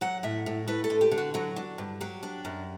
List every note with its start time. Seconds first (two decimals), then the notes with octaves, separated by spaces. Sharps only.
0.01 F#3 F#5
0.23 A2 E5
0.46 A2
0.68 A3 B4
0.84 A4
0.90 D3
1.01 G4
1.11 D3
1.18 F#4
1.34 F#3 F#4
1.56 D4
1.78 G2
2.00 F#3 G4
2.23 D4
2.45 F#2